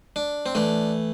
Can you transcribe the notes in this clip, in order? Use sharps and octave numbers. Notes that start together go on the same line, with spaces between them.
D4
C4
E3 A3 D4